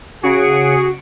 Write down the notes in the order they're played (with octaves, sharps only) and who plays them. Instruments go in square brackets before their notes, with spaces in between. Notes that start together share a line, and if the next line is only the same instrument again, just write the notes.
[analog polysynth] C#3 C#7 D7 [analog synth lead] F#4 [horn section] G#4